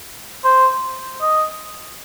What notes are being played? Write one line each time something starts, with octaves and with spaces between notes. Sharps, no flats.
C5
D#5